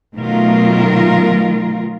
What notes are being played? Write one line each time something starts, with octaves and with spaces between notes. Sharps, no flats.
B2 D#3 F#3 A3 F4 A#4